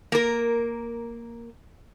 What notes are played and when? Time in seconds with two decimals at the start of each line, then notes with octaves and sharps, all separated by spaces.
0.12 A#3 A#4